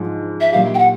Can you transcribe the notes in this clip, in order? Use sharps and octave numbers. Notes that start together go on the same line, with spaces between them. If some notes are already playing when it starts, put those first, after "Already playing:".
Already playing: G#2 F3 G#3
E5
A#2 F#3 A#3 D#4 G4 F5
G5
F#5